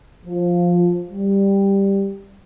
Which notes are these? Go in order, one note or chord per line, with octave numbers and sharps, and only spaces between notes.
F3
G3